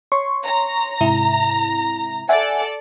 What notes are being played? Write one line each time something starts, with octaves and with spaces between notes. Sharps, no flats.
C#5 C6 C#6
A#5
G#2 C3 E4
A4 D5 E5 F#5 G#5